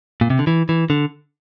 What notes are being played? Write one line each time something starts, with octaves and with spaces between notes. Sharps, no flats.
A#2
C3
D3
E3
E3
D3